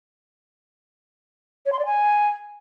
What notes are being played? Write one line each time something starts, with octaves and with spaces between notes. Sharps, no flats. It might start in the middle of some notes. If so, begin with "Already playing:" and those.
C#5
C6
D5
G#5